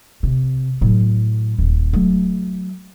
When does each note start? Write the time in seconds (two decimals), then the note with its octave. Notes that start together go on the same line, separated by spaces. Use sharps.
0.23 C3
0.81 A2 F#3
1.58 D#1
1.93 F#3 A3